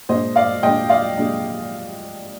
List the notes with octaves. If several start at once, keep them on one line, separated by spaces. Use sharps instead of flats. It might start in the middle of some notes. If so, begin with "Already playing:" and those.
A#2 G#3 D4 C5 D#5
D5 F5
A#2 G#3 D4 D#5 G5
D5 F5
A#2 G#3 D4